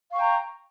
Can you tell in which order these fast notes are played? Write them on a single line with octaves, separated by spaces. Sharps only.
F5 C#6 G5 A#5